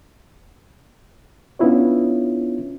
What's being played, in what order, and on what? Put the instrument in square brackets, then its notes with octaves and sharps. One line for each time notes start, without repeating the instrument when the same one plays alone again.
[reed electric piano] B3 C#4 D4 E4 F4 C#5